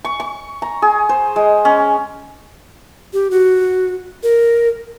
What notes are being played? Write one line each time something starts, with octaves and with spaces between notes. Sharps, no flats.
C#6
C#6
A#5
G#4
C5
G#3
C#4
G4
F#4
A#4